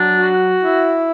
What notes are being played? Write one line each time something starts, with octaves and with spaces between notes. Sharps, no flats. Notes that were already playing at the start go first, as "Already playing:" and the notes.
Already playing: F#3 D4
F#4
E4